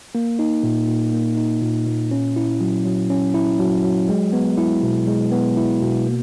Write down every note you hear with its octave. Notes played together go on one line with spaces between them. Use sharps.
A#3
D#4
A#2
A#2
A#3
D#4
A#2
A#2
C#4
E4
F#3
F#3
C#4
E4
F#3
F#3
G#3
B3
E4
B2
G#3
B3
E4
B2
A#3